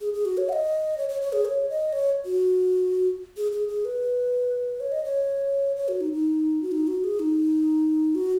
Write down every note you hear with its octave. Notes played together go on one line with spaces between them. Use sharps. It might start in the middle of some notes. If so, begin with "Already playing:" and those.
G#4
G#4
F#4
C#5
F#5
D#5
C#5
C#5
C#5
G#4
C#5
D#5
C#5
F#4
G#4
G#4
G#4
B4
C#5
D#5
C#5
C#5
F#4
D#4
D#4
F#4
D#4
F#4
G#4
D#4
F#4